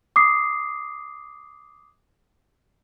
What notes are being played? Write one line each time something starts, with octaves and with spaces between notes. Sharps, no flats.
D6 D#6 C7